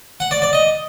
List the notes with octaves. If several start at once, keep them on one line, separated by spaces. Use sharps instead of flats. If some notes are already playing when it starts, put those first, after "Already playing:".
F#5
D5
D5
D#5